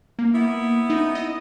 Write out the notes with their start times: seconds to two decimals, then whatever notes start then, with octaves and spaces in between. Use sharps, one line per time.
0.19 A#3
0.35 B3 E4
0.90 D#4
1.15 D#5